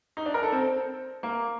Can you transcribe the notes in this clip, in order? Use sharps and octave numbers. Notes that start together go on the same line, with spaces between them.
D#4
D4
A#4
A4
C4
A#3